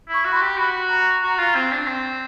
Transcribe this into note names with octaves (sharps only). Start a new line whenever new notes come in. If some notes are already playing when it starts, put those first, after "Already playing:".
E4
C#6
F#4
B5
C6
G4
F#4 B5
A#5
F#4
F4
C4
D4
C4